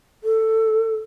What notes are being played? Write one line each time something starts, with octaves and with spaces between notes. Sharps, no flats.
A4